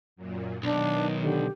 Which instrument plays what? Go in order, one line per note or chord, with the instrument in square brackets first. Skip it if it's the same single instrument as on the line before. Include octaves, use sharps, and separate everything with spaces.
[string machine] F#2 A#2
[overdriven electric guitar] B1 [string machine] D#3 [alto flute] D4
[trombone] D3 [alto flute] G4